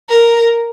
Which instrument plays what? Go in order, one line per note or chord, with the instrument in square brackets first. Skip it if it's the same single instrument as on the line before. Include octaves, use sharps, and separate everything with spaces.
[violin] A#4